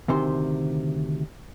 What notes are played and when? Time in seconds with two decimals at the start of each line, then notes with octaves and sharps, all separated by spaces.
0.08 D2 C3 D#3 C5 C6